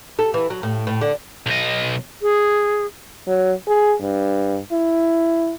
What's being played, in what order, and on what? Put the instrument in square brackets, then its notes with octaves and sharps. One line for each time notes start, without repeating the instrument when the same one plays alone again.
[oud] A4
E3
F#3
A2
A2
D3
[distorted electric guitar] B1 D#5
[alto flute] G#4
[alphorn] F#3
G#4
G2
E4